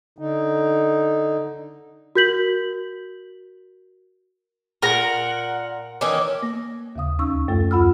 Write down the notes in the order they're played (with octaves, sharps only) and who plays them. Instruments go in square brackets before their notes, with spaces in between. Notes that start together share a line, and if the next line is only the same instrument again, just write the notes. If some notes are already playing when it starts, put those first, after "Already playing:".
[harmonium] D3 D#4
[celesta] F#4 A#4 G6 B6 F#7
[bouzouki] A#2 [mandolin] A#4 A#5 [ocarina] F#5
[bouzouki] D#3 E3 C#4 [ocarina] D6
[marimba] A#3
D#2 C#3 F5 D#6
D2 C#4 D#4 C#6 E6
F#2 A3 A4
D#2 F4 F#5 B5 E6 F6